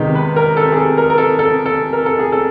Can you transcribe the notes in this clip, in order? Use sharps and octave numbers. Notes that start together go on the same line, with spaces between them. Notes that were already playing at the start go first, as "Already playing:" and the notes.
Already playing: C3 D#3 G#3 B3 D#4
B4
A#4
A4
G#4
A4
A#4
A#4
A4
A4
A4
A#4
A4
G#4
A4